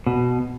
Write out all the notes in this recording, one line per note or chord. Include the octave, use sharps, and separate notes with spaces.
B2